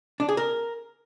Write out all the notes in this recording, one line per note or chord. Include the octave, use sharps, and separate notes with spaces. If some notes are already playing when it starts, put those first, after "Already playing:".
D4
G#4
A#4